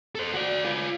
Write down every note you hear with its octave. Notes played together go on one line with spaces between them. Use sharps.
A4 C5
F#4 D5
F4 B4